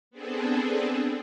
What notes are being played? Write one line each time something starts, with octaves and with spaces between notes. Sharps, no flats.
B3 C4 D4 G#4 A4